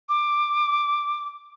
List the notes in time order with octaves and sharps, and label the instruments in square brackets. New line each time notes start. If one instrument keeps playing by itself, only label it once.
[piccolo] D6